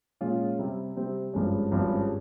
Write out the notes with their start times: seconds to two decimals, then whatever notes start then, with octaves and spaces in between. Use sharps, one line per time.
0.21 A#2 G#3 C#4 F4
0.58 C3 G3 C4
0.96 C3 G3 C4
1.34 G#1 G2 F3 G#3 C#4
1.72 G#1 G2 F3 G#3 C#4